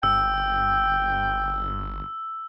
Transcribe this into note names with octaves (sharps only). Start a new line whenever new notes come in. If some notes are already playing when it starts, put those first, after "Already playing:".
G1 G5 E6